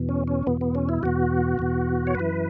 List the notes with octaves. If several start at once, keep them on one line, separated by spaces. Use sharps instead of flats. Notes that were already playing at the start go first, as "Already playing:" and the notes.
Already playing: E2 B2
C#4
C#4
E2 B2 B3
B3
C#4
E4
E2 B2 F#4
E2 B2
C#5
F#2 E3 B4